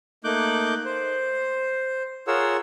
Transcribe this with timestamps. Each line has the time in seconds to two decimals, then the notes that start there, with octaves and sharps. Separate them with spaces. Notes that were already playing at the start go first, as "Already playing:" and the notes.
0.24 A3 A#3 D#4 D6 F#6 G6
0.85 C5
2.27 F4 G#4 A#4 C#5 F#5 E6